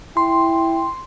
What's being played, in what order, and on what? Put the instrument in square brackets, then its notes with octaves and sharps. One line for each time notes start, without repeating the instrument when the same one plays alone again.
[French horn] E4 [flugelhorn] G5 [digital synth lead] C6